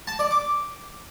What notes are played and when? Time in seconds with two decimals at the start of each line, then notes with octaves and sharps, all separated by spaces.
0.07 A5
0.19 D5
0.31 D6